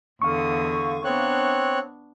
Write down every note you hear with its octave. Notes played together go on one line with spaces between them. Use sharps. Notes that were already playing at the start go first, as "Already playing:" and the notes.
E2 D3 F5 C#6 D#6
B3 C4 D4 C#5 F#6